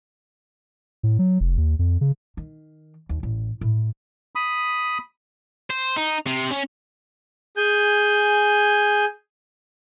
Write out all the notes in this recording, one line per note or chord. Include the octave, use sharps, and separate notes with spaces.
A2
F#3
F1
D#2
F2
C#3
D#3
D#2
A1
A2
B5 D#6
C5
D#4
C3
C#4
G#4 G#5 G6